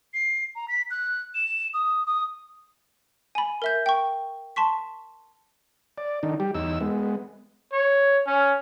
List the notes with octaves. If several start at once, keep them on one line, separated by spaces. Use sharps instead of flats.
C7
A#5
B6
F#6
E7
D#6
D#6
G#5 B5
A#4 E5 G6
G5 C#6
A5 C6 C#6 B6
D5
D#3 D4 D#4
G3 G4
E2 D#4 E6
G#3 B3
C#5
C#4